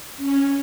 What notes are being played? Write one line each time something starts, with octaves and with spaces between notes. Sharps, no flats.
C#4